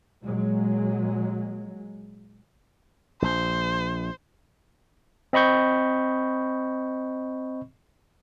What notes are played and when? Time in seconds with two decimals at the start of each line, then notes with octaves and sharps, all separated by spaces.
0.22 A#2 F#3 G#3
3.22 A#1 C5
5.33 C4 D#5 B5 C#6 G6